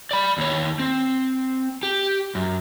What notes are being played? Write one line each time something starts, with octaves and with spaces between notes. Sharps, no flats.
D5 B5
D#2 C#5
C4
G4
F#2